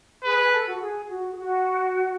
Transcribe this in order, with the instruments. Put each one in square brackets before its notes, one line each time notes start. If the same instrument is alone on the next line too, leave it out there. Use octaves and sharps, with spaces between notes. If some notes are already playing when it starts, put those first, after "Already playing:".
[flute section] G#4 [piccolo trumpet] B4
[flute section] G#4
A4
F#4
G#4
F#4
G#4
F#4